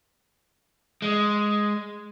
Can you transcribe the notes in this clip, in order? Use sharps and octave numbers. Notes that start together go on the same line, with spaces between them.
G#3